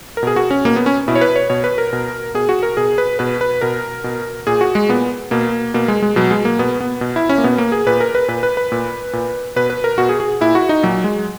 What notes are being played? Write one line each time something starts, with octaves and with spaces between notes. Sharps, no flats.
A#4
B2 G#4
F#4
C#4
B2 A#3
B3
C#4
B2 E4
C#5
B4
C#5
B2 C#5
B4
A#4
B2
B2 G#4
F#4
A#4
B2 G#4
B4
B2 B4
B4
B2 A#4
B2
A#2 G#4
F#4
G#3
A#2 B3
B2 A#3
B2 A#3
G#3
G#3
B2 F#3
G#3
A#3
B2 B3
B3
B2
E4
C#4
A#3
B2 B3
A#3
G#4
A#2 B4
A#4
B4
A#2 B4
B4
B4
A#2
A#2
B2 B4
B4
A#4
B2 F#4
G#4
G#4
A#2 E4
F#4
D#4
A#2 F#3
G#3